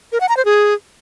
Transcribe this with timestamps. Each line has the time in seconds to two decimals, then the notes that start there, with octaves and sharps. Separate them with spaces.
0.12 A#4
0.21 F#5
0.29 A#5
0.37 C5
0.45 G#4